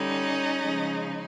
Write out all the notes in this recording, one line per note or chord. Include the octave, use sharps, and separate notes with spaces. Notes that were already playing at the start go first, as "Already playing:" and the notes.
Already playing: D3 G3 C#4 D#4
C#3 F3 G#3